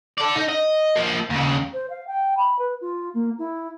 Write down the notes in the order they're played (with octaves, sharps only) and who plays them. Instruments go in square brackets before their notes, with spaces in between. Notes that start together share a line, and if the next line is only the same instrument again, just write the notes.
[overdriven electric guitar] A4 D5
D#4
D#5
F3 A#3
D#2 C#3
[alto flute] C5
F5
G5
B5
B4
F4
A#3
E4